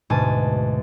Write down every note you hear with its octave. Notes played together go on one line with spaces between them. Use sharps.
D2 G#2 B2 G#5 A5